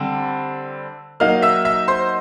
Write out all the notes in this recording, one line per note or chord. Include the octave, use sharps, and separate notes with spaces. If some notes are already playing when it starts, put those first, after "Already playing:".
Already playing: D3 G3 C4
F#3 A#3 D#4 F5 F6
E5 E6
E5 E6
C5 C6